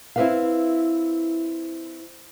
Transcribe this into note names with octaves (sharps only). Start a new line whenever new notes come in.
C4 E4 G4 B4 C5 F5